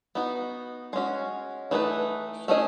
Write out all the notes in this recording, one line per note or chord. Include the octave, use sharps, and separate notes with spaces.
B3 D#4 F#4
G#3 C#4 F#4
E3 A3 D#4 G#4 B4
A3 C#4 G#4 B4 D#5